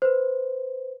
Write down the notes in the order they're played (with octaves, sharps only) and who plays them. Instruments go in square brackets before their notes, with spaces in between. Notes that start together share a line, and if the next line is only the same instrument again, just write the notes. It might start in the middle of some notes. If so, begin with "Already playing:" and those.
[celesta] B4 C5